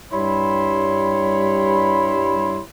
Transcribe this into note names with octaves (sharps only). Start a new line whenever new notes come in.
G2 G3 E4 C#5 B5 C6